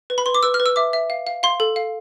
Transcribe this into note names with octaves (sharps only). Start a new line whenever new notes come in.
B4
B5
B4 C6
D6
B4 E6
F6
B4
E6
E5 D6
E5
F5
F5
F5 C6
A4
F5